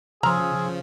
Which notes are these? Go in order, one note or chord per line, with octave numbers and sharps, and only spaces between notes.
C#3 F3 G#4 A#5 C6 E6 F6